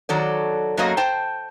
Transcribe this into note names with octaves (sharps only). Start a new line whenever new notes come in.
D#3 F#3 A4 D5
F#2 F#3 A3 A#3 F#4 D#5
C5 G5 A5